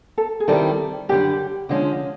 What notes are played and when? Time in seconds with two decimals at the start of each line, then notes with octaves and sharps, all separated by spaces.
0.18 A4
0.40 G#4
0.48 D#3 G3 C4 E4 A4
1.09 F#2 D3 G3 G4
1.69 D3 F3 G#3 C#4